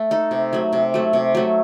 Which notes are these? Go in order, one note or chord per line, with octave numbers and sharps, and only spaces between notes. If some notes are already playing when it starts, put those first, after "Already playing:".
Already playing: A3
D#4 A4
C3
F#3 A3
C3
F#3 A3
C3
F#3 A3